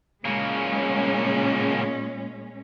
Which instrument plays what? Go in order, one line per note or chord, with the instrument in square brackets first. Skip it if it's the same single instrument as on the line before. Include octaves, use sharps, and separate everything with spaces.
[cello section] A#2 G#3 C#4 [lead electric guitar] C#3 A#3